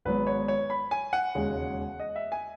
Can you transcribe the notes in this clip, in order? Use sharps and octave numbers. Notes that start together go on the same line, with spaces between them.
G#1 G#2 F#3 B3 B4
C#5
C#5
B5
G#5
F#5
E1 D#2 C#3 G#3
D#5
E5
G#5